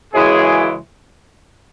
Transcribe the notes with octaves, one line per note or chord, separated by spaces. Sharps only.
F#2 C#3 E3 G#3 G#4